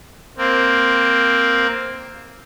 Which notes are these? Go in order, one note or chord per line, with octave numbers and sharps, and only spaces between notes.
A#3 C4